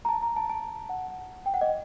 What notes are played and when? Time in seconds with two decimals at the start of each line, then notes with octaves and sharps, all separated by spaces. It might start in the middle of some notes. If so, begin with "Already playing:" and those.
0.05 A#5
0.09 A5
0.23 A#5
0.37 A5
0.50 A5
0.89 F#5
1.46 G5
1.54 F#5
1.61 D#5